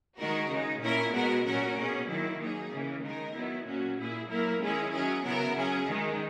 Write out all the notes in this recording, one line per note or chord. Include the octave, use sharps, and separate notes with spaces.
D#3 G#3 D#4 F#4 A#4
C#3 G#3 D#4
A#2 A#3 C#4 E4 A#4
B2 G#3 B3 F#4 A#4
A#2 F#3 C#4 F#4 A#4
B2 A#3 C#4 G#4
D#3 F#3 A#3 E4
F#3 A#3 D#4 G#4
C#3 E3 A#3 C#4
D#3 G#3 D#4 A#4
D#3 F#3 B3 E4
A#2 F#3 C#4 F#4
A#2 A#3 E4 G#4
F#3 A#3 E4 A#4
D#3 G#3 C#4 E4 G#4
F#3 C#4 G#4
C#3 F#3 B3 E4 A#4
F#3 C#4 G#4
D#3 G#3 D#4